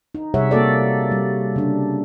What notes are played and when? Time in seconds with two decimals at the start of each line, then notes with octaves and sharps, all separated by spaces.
0.15 D#4
0.34 C3 G3 G#4 C#5 E5 F#5
0.51 A#3 F#4 A4 D5
1.11 G3
1.56 C#3 D4